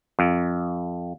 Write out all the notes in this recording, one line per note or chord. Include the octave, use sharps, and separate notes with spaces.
F2